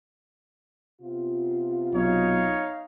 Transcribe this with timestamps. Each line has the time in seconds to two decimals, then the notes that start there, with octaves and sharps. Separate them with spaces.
1.01 C3 B3 F4
1.94 B1 D#4 C#5 F5